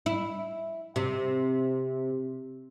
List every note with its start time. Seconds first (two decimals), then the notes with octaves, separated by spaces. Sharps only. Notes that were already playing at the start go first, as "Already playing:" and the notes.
0.06 E4
0.96 C3